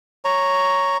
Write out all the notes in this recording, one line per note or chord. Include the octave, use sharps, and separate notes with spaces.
C#5 A#5